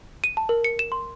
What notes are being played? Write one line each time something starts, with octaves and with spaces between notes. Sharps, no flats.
D#7
A5
A#4
C#7
E7
C6